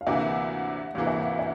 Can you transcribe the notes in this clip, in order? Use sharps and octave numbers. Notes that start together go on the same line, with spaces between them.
F5
D2 C3 E3 A#3 E5
D2 C3 E3 A#3 F5
E5
F5
E5